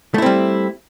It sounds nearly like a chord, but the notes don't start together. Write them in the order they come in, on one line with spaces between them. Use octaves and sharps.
A3 E4 C4 G3